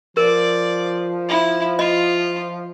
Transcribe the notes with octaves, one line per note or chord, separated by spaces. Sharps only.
F3 A#4 D5
E4
F4 D#5